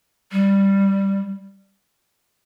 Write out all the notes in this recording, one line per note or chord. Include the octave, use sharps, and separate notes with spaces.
G3